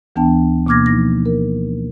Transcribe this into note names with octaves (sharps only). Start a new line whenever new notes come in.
D2 E3 B3 D4 G5 A5
B2 A#3 D6 F6 G#6 A#6
F3 D#4 A#6
A#4